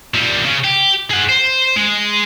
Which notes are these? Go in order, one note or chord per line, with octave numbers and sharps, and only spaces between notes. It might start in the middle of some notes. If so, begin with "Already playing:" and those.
A#2 G3
C#3
G4
G#4 F#5
C5
G#3